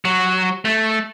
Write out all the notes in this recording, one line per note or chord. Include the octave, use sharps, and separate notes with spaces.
F#3
A3